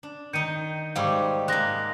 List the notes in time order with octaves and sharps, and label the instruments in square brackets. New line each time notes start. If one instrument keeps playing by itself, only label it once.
[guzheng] D4
[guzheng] D#3 D#4 [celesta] G6 C#7 D#7
[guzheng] G#2 G3 C#5 [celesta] F5 D6
[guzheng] G#3 A#3 [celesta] F#6 A#6